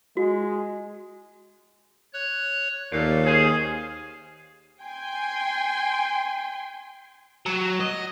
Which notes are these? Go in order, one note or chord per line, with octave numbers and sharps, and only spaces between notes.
G#3 F#4
C#5 F#6
D#2 A#2 A3 F5
C#4 G#4 C5
G5 G#5 C6
F#3
D#5